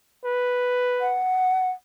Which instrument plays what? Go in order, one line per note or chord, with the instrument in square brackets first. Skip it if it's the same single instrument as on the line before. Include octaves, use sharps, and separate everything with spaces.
[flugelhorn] B4
[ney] F#5